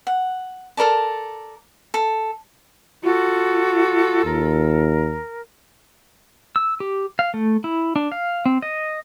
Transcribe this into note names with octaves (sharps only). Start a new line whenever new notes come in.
F#5
A4 A#4 D5 A5
A4
F4 F#4 A4
D#2 A#4
E6
G4
F5
A3
E4
D4
F5
C4
D#5